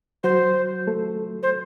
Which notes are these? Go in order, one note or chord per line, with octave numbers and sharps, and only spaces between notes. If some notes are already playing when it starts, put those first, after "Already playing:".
F#3 F#4 C5
A3 A4
C5